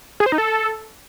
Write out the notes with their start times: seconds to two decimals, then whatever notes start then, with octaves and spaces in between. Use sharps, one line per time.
0.20 G#4
0.26 C5
0.32 D#4
0.38 A4